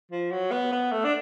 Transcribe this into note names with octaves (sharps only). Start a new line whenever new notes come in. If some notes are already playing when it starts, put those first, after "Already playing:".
F3
F#3
B3
B3
A3
D4